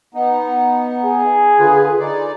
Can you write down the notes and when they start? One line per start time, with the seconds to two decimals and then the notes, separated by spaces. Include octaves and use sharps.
0.14 B3 D#4
1.04 G#4
1.59 D3 F4 B4
1.99 D#4 D5